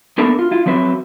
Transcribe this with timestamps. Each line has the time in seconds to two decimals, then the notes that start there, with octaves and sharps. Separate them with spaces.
0.18 A#3 B3 D4 A4 A#4 E5
0.39 F4
0.51 E4 F4
0.66 F3 F#3 C4 B4 E5